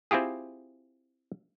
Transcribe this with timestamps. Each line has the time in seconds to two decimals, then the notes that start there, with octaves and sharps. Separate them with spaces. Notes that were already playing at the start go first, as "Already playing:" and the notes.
0.11 C4 E4 F4 G4 G#4